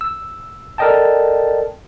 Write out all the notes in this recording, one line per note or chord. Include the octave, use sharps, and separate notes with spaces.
E6
A4 A#4 D5 D#5 G5 A5